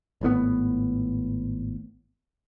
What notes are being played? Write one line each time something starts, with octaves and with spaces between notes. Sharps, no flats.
G#1 A2 C#3 B3